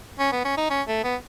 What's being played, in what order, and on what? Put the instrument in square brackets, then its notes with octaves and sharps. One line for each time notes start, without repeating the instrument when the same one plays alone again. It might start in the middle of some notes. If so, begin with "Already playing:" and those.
[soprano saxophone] C#4
B3
C#4
D#4
C#4
A3
B3